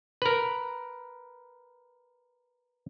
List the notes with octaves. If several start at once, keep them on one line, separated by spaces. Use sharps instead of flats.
A#4 B4